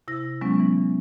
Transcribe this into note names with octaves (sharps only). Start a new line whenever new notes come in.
C3 E4 A#6
F#3 G#3 B3 C#4
E3